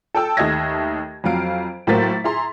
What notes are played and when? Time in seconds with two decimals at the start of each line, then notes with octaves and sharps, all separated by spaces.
0.14 A4 G5 A5 E6
0.37 D#2 A3 D#5 E5 G#6 A#6
1.24 F2 F#3 F5 D7
1.87 A2 F#3 A#3 C5 A6 B6
2.24 E4 G#4 A#5 C6